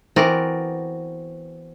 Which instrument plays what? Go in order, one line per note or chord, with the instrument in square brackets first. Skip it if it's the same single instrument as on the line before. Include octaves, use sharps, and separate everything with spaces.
[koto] E3 B3 C4 F#4 A#4 D5